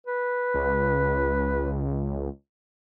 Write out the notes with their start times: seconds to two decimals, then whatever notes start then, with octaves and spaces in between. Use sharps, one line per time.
0.07 B4
0.54 C#2